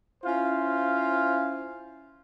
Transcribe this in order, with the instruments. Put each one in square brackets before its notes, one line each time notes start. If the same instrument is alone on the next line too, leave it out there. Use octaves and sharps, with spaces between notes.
[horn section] C#4 E4 F4 C5 F5